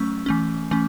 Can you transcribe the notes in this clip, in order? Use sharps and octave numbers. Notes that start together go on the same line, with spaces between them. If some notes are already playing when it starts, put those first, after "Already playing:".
Already playing: F#3 A3 C#4 C#6 E6
E3 A3 C#4
E3 A3 C#4